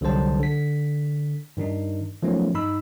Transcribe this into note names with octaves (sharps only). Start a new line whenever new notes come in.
C2 D3 F#3 G3 C5 A5
D3 B6
G2 D#3 D4 D#4
D#3 F3 F#3 A3 B3 C#4
G2 D#4 B5 E6